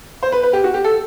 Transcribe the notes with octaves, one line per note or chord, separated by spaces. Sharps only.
C5
B4
B4
G4
F#4
G4
A4